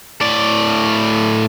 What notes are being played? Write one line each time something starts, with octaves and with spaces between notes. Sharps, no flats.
A2 D5